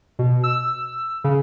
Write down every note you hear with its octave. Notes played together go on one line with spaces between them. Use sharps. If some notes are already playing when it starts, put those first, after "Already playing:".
B2
E6
C#3